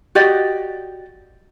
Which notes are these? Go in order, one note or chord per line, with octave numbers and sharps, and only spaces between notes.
F#4 G4 D5 D#5